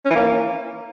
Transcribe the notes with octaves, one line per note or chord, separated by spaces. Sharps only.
C#4
E3
A#3